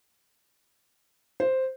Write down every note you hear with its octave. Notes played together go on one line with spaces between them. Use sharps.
C5